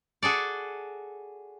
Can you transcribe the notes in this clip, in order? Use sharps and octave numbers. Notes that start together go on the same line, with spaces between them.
F#4 G#4 A4 D5